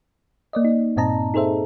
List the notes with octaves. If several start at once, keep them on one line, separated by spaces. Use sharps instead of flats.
A#3 D5 D#5
D#4
G2 A#2 C4 D#5 A5 A#5
D#4 G#4 A4 C5 E5